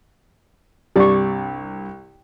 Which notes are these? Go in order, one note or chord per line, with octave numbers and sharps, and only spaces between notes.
C2 G2 G4 D5 C#6